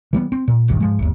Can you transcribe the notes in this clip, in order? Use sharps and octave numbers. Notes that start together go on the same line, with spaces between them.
E3 G3 B3
C4
A#2
D#1 A#1 G2 D#3
G#2 F3 G#3
G1 D#2